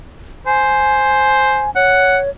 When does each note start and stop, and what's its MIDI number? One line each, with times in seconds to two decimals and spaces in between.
0.46 1.67 72
0.46 1.70 80
1.76 2.30 73
1.76 2.18 78